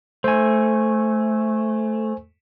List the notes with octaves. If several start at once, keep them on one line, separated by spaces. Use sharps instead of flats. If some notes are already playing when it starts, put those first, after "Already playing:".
A3 C5 G#5